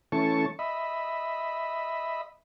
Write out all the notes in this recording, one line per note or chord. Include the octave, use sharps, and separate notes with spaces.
E3 A3 C#4 A5 C#6
D#5 E5 B5